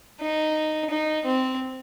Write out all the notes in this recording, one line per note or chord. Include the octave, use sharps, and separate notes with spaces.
D#4
D#4
C4